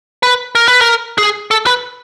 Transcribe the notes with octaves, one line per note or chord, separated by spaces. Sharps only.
B4
A#4
B4
A#4
G#4
A4
B4